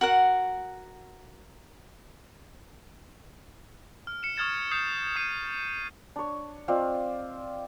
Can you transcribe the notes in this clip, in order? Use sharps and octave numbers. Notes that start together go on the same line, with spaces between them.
F#4 A#4 F#5
F6
C#7 E7
C#6 D#6 F6 G#6 A6 E7
D#6 F6 G6 C7 E7
D#6 G6 C7 D#7 E7
D4 C#5
C4 F4 D5 D#5